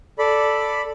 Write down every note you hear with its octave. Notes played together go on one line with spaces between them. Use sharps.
A4 D5 B5